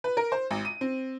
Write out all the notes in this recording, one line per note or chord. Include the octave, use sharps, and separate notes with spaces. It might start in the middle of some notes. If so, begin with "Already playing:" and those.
B4
A#4
C5
G#1
D#7
C4